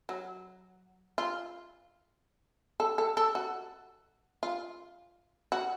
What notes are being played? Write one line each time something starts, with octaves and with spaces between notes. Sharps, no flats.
F#3
F4
A4
A4
A4
F#4
F4
F#4